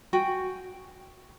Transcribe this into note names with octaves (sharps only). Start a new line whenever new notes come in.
F#4 G5 G#5